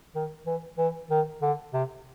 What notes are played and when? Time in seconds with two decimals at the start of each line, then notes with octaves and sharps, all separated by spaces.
0.15 D#3
0.46 E3
0.78 E3
1.10 D#3
1.42 D3
1.73 C3